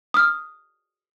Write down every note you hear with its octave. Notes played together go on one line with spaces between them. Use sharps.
D#6 F6